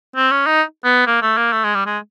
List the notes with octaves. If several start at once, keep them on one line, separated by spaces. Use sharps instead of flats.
C4
C#4
D#4
B3
A#3
A3
A#3
A3
G#3
G3
G#3